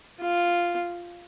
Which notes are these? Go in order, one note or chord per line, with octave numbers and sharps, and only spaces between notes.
F4